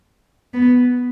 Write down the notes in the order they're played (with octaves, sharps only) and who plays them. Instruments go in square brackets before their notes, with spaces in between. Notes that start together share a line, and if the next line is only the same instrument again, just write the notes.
[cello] B3